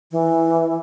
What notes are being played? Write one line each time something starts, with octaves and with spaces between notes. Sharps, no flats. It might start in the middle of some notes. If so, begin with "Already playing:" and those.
E3